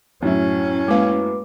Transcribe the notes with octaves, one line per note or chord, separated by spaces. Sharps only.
F#2 A2 C#4 E4
G#3 A#3 B4 F5 D6